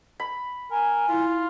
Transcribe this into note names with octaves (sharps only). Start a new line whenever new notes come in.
B5
A#4 G#5
E4 F4